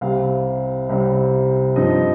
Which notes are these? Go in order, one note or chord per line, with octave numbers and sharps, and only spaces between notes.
C2 C3 G3 C4 F5
C2 C3 G3 C4
G2 F3 C4 D#4 D#5